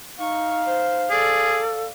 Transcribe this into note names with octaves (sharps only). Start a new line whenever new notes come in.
D#4 F5 C#6
C5
G#4 A4 D5